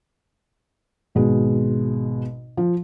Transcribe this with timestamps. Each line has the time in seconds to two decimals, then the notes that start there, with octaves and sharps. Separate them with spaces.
1.15 G#1 B2 G#3
2.57 F3